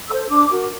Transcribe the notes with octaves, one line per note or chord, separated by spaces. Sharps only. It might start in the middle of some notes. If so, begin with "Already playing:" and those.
A4 C5 E6
D4 D6
F#4 A#4